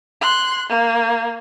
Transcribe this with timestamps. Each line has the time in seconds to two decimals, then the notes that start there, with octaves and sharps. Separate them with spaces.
0.21 C6 F#6
0.69 A#3